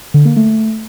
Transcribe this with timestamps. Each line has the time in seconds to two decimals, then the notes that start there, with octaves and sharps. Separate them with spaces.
0.14 D3
0.25 A#3
0.37 A3